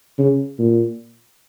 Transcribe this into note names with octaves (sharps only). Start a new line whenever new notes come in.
C#3
A#2